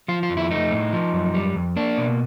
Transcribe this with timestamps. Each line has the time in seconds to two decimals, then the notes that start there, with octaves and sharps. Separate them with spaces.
0.08 F3 F4
0.23 F4
0.30 F2
0.37 E4
0.51 A3 D#4
0.72 A2
0.93 F3
1.13 F#2
1.34 G3
1.56 F2
1.76 A#3 D4
1.98 B2